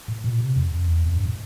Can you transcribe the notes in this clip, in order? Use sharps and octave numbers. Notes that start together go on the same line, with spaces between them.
A2
A#2
C3
F2
F2
E2
F2
G2
A2